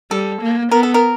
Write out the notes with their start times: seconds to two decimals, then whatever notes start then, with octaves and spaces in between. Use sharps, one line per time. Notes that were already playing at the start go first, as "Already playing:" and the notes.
0.11 G3 A4
0.41 A#3
0.71 B3 A#4
0.83 A4
0.94 A#4